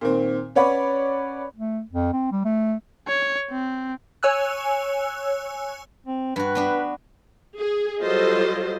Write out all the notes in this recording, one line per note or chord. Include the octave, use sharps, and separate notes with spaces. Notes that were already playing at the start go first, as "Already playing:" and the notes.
A#2 D#3 C4
C#4 B4 C#5 D5 F#5 B5
A3
F2
C4
G3
A3
C#5
C4
C#5 G#5 E6 F#6
C4
G2 F#4 B4
B3 D4 F#4
G#4
F#3 G3 F4 A4 C5 D#5